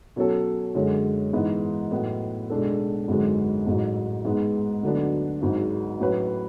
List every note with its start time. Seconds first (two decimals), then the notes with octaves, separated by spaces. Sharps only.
0.16 B2 F#3 C#4 F#4 A4
0.75 F#2 D3 G#3 C#4
1.33 G#2 E3 B3
1.91 A2 F#3 B3
2.50 B1 B2 G#3 D4 A4
3.08 G#1 F#2 D3 G#3
3.67 A1 G#2 F#3
4.25 G#2 G#3 B3
4.83 D2 D3 F#3 B3 D4
5.41 G#1 G#2 F#3
6.00 A2 F#3 C#4 F#4 B4